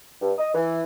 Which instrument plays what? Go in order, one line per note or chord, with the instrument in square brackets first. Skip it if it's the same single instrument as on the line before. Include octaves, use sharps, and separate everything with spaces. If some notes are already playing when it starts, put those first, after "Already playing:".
[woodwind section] G2
D#5
E3